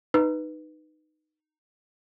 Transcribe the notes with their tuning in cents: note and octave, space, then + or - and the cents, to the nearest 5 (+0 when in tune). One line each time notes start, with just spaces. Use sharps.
D#4 -10 B4 +0 E6 +40